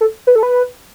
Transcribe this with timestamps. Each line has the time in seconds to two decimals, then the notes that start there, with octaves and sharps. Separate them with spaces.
0.01 A4
0.27 B4
0.35 A4
0.43 B4